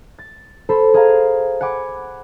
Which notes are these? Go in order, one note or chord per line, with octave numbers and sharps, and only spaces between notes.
A6
A4 C5 B5
G#4 F5 A#5
F#5 G#5 B5 D6